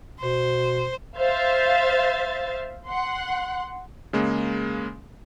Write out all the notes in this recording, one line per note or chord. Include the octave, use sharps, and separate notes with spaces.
B2 C5
C5 E5 F5 A6
F#5 C6
C#3 G#3 A#3